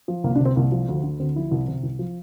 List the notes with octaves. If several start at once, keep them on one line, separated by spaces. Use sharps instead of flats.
F3
C2 A#3
D4
C3
C4
C2 A#3
F3
D2
D3
D2 C4
F3 E4
C2
C3
C2
F3